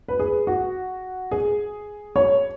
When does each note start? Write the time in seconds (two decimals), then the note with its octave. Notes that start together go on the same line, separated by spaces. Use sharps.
0.08 B4
0.19 G#4
0.47 F#4
1.31 G#4
2.16 C#5